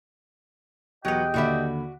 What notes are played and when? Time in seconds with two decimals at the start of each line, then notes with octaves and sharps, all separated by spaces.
1.05 E2 B2 F#3 B3 G4 D#5 G5
1.34 D#2 D3 F#4 D5 E5 B5